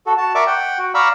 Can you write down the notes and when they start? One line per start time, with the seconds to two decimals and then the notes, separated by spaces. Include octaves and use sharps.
0.07 F#4 A4
0.18 F#4 A5
0.35 A#4 D5 E5 C#6 D6
0.47 F#5 G5
0.78 F#4
0.95 D5 F5 A#5 B5 C#6 E6